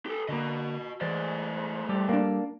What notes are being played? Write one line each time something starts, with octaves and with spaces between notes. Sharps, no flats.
G4 A4
D3 A#3 F#4 D#5
A2 E3 G#3 C5 D5
G3 G4 A4
A#3 D4